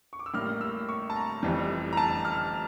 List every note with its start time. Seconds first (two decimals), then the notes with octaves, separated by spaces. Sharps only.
0.13 C#6
0.19 D6
0.26 E6
0.33 A1 A2 G3 A#3 F6
0.61 E6
0.89 C#6
1.10 A5
1.16 A#5
1.43 F1 F2 E3 G3
1.93 A#5
1.97 A5
2.25 F6